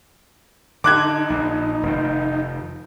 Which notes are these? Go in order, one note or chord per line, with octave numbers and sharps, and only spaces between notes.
D3 D#4 D6 F#6 G#6
A#1
F1 F2 D#3